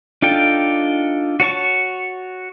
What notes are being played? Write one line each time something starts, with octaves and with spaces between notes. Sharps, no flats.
D4 D#4 F4 A4 G5
F#4 C#5 A5 C#6